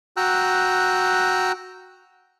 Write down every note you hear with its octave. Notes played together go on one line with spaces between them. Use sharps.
F#4 G5 A#5 E6 F#6